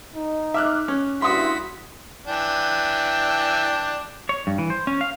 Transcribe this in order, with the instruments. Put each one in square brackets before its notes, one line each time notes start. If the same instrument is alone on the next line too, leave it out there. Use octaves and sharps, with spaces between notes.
[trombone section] D#4
[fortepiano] E5 [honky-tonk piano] D6 F6 F#6
[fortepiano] C#4
[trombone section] G2 E4 [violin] F#4 B6 [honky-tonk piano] C6 D#6
[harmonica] E3 D4 G5
[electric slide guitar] C#5
G2
E3
C5
C#4
F5